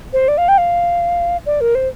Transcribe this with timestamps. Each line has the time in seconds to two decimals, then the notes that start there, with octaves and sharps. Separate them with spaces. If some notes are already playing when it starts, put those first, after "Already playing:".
0.13 C5
0.28 D5
0.38 F5
0.48 G5
0.58 F5
1.46 D5
1.61 A#4
1.75 C5